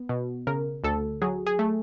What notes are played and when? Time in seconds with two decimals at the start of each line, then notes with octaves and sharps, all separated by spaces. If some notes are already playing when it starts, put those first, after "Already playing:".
Already playing: B3
0.09 B2
0.47 C#3 A#4
0.84 D2 A4
1.22 F#3 G#4
1.46 G#4
1.59 A3